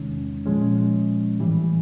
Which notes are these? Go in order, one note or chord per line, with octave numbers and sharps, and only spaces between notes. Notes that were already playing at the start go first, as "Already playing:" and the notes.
Already playing: E2 C3 D#3 G#3 C#4
A#2 F3 G#3 C#4
A2 E3 G3